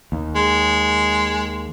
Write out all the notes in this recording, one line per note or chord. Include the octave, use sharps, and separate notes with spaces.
D#2
G#3